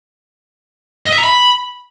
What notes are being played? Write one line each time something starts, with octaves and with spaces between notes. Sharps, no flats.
D#5
E5
A#5
B5